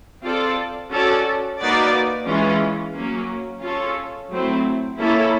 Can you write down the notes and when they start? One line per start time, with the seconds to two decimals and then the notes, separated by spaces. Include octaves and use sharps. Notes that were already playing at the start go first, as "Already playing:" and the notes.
0.23 C4 F4 A4 D5
0.91 C#4 F#4 A4 D5
1.59 A#3 D#4 F#4 B4 D5
2.27 E3 G#3 C#4 F4
2.95 F#3 A#3 C#4
3.62 C#4 F4 A4 C#5
4.31 F#3 A3 C4 E4
4.99 A#3 C#4 E4 A4